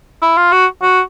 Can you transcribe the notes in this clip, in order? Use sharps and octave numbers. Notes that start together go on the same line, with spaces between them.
E4
F4
F#4
F#4